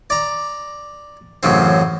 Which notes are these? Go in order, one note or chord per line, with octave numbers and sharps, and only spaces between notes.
D5 A#5
A1 F#2 C#3 C4